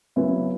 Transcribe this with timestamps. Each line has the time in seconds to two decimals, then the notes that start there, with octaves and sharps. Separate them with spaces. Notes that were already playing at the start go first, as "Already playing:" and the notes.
0.16 C#3 F#3 B3 E4